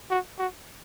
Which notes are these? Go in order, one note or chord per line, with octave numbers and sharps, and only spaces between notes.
F#4
F#4